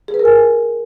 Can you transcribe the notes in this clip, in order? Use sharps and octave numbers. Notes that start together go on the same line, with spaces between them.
G#4
B4
A#4
G#5